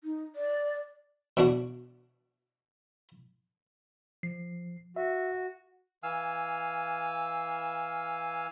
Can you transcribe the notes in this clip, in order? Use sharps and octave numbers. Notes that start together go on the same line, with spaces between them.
D#4
D5
B2 D4 F#4
F3 C7
F#4 E5
E3 F5 G#5 E6 F6